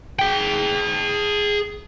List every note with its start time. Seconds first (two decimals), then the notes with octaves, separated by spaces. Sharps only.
0.19 G#4 G5